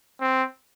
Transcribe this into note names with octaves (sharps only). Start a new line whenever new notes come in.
C4